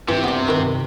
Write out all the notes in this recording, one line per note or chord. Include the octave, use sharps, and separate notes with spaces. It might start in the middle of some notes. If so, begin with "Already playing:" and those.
G2 C3 E3
B3 D5
D#3 B4
C3